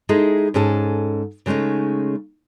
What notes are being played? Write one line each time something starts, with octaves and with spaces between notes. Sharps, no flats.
G#3 D#4 E4 G#4 A4 D#5
G#2 C#4 G#4 A4
C#3 G#3 A3 C#4 D#4